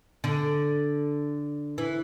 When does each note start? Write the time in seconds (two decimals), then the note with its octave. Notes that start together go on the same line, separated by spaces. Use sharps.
0.24 D3
1.78 E3